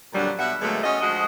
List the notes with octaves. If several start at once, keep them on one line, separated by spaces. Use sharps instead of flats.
F2 A#2 D3 F#3 G3 D4
B2 E5 F#5
A#2 D3 F#3 G#3 A3 B3
C#4 F4 F#4 D#5
D2 F3 G#3 F#4 D#5